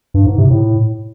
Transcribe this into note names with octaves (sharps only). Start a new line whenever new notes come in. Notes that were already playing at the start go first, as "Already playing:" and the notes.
G2
G#2
C3
A2